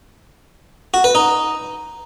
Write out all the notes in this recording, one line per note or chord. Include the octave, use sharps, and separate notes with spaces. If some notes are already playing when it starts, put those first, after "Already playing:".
F#4
B4
D#4